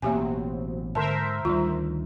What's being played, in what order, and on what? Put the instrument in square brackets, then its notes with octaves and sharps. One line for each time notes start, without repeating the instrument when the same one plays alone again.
[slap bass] A1 B2 [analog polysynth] F#3 C4 [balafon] A#3 G4 G#5
[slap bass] G#2 [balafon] D3 A5 [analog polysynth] A#4 C5 E5
[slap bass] D2 D3 D#3 [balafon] G3 F4